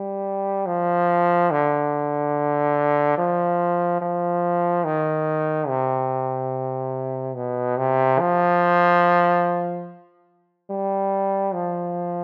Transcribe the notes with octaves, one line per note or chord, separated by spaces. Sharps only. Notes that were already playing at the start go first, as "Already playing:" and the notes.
Already playing: G3
F3
D3
F3
F3
D#3
C3
B2
C3
F3
G3
F3